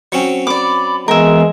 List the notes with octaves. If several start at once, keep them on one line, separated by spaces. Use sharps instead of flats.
F#3 C4 C#4
D5 B5 D6
E3 G#3 B3 A#4 E5